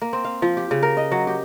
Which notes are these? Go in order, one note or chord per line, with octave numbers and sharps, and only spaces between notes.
A#3
C4
F5
F3
G4
C#3
A#4
D#5
F#3
G4